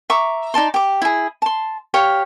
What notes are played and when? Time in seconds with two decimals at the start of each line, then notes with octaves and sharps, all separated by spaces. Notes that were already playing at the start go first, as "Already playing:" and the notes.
0.10 E5 A#5 C#6 D6
0.54 D#4 D5 A5 C6
0.74 G4 D6
1.02 E4 G#4
1.42 A5 C6
1.94 G4 C#5 F5